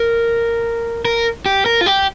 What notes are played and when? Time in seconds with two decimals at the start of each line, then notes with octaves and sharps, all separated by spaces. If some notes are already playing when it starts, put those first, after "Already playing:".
Already playing: A#4
1.05 A#4
1.46 G4
1.66 A#4
1.81 F4
1.86 G4